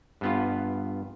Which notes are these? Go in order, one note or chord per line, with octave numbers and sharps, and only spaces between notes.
G2 B3 F4